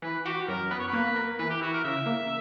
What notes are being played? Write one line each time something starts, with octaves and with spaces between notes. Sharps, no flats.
E3 B4
F#4 G4
F#2 A#4
B3 B4
C#5
B4
A#3
A#4
E3 B4
G4
E4 F#4
A#4
C#3 E5
A#3